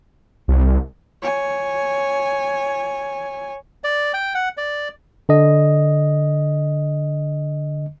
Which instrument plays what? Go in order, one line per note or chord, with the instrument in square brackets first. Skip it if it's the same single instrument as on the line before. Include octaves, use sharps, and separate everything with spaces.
[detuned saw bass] C2
[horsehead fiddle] C#5 G#5
[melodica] D5
G5
F#5
D5
[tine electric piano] D3 D#5